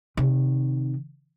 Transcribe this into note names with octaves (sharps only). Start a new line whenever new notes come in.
C3 D#3